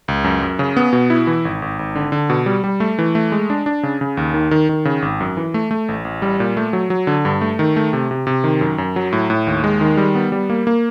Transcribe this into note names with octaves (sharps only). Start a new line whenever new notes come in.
C#2
F#2
F#2
C#3
B3
B2
E4
E3
G#1
G#1
G#1
D3
D3
B2
G3
G3
A3
E3
A3
G#3
D4
D4
C#3
C#3
D#2
D#3
D#3
D#3
C#3
G#1
F#2
E3
A3
A3
A1
A1
G3
A#2
A3
F#3
F#3
D3
G2
A3
D#3
A3
C3
C3
C3
D#3
F#2
F#2
F#3
A2
A2
D#2
G#3
D#3
G3
B3
G3
A#3
A#3